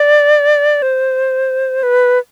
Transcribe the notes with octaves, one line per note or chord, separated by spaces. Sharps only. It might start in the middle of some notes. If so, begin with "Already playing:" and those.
Already playing: D5
C5
B4